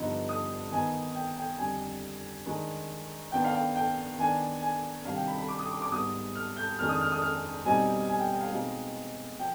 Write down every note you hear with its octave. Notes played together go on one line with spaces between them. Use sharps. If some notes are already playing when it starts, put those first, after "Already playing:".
Already playing: G2 D3 F3 B3 D#4
D#6
D#3 B3 D#4 G#5
G5
G5
F2 D3 G3 G#5
D#3 G#3 D4
D#3 B3 D4 G5
F5
G5
G5
D#3 B3 D4 G#5
G#5
C3 D#3 G3 D4 F5
G5
B5
B5
D6
D#6
D6
D6
G#2 G3 B3 D#6
F6
G6
F2 D#3 G#3 D4 F6
D#6
F6
D#6
F6
B2 G3 C4 D#4 G#5
G#5
G5
G5
F5
B2 G#3 C4 D#4
F3 G5